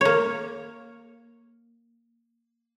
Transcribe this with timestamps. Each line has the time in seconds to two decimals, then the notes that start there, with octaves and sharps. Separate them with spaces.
0.01 A#3 C#5